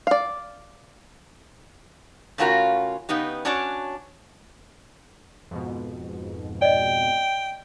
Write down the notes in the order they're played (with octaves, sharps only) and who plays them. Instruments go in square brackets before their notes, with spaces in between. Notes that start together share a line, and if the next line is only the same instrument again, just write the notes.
[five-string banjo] D5 F5
[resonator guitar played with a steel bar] C#3 A3 C#4 F4 F#4 A#4
C#3 B3 D#4 G4
C#4 D4 F#4 C#5 D5
[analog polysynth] F2 G#2 B2
[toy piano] D5 D#5 [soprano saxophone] G5